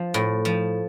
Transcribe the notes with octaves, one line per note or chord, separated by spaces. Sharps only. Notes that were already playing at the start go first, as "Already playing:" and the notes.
Already playing: F3
A2
F3